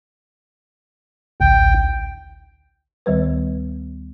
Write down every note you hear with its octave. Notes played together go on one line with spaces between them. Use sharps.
A1 D2 G5
D2 D#3 G3 B4